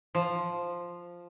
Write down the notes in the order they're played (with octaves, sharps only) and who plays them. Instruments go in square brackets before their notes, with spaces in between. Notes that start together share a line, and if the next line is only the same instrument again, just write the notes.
[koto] F3